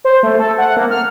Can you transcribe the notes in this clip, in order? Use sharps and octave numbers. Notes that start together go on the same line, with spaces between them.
C5
A3
A4
F#5
A#3
F6